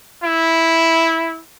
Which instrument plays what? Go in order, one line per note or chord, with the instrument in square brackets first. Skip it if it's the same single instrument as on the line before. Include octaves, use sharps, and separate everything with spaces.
[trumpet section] E4